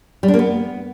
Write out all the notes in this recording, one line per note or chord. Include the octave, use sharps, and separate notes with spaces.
G3
D4
A#3
B3